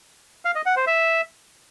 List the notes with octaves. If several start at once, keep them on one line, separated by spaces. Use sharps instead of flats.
F5
D#5
F#5
C5
E5